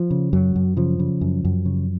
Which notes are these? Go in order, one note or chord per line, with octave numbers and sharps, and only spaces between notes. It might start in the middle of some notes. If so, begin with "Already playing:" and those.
Already playing: F3
C#3
F#2 F#3
F#2
C#3 F3
C#3
F#2
F#2
C#3